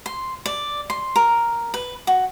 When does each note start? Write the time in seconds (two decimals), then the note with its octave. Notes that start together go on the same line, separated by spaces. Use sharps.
0.06 C6
0.46 D5
0.90 C6
1.16 A#4
1.74 B4
2.07 F#4